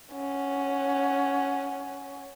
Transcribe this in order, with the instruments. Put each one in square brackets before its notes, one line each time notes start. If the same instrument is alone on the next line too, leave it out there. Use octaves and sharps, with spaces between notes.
[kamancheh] C#4 F#5